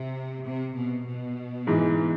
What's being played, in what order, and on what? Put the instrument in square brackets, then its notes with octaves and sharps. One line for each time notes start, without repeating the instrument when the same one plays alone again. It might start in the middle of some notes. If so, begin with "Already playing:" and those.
Already playing: [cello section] C3
C3
B2
B2
[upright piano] G#2 E3 G#3